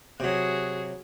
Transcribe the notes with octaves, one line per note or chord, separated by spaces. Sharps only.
C3 F#3 F#4 G#4